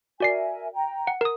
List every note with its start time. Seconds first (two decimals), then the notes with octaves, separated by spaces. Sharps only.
0.20 F#4 A#4 D5 E5 G#5 C7
0.74 G5 A#5
1.07 F#5
1.21 A#4 D#6